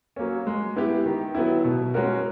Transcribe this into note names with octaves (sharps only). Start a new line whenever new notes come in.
F#3 A#3 C#4
G#3
B3 E4 G4
D#3
F#3 B3 E4
B2
G#3 C#4 F#4 A#4